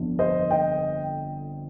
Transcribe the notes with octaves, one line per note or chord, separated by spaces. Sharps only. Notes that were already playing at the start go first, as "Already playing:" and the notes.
Already playing: G1 F2 D3
C5 D#5
D#5 G5